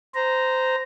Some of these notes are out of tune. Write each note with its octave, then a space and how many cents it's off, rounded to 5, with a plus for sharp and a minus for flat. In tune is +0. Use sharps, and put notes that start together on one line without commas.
C5 -15 A#5 +0